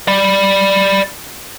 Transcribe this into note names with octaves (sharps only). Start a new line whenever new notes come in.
D5 B5